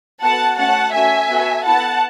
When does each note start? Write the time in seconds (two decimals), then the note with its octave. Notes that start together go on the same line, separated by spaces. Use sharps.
0.22 B3 F#4 A4 F#5 A5
0.58 A3 C#4 F#4 F#5 A5
0.93 A3 C#4 F#4 A4 E5 G#5
1.29 B3 F#4 A4
1.64 B3 E4 A4 F#5 A5